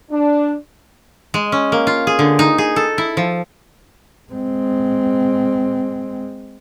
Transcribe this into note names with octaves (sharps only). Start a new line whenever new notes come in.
D4
G#3
C#4
A#3
F4
G#4
D3
D#4
G#4
A4
E4
F3
G#3 C4